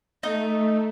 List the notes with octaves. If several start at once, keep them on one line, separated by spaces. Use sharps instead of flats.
A3 D#4